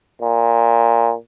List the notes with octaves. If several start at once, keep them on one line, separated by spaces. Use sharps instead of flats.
A#2